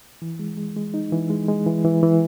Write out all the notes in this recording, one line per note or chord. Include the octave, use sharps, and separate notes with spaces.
E3
G#3
G#3
G#3
D#4
E3
G#3
G#3
E3
E3
E3